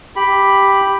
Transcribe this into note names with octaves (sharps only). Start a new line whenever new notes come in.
G4 B5